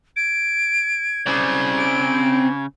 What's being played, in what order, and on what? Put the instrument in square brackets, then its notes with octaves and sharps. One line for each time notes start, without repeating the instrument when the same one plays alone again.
[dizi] G#6 [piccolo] D7
[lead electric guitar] C#3 [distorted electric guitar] C4 D5
[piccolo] D7